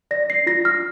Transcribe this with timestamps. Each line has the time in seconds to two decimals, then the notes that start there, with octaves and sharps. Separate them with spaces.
0.11 D5 A#6
0.30 C7
0.47 F4 A#6
0.65 F6